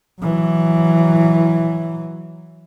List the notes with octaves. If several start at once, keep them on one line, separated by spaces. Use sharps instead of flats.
E3 F#3